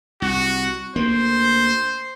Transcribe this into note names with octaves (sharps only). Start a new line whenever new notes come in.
C2 F#4
D2 A#3 C5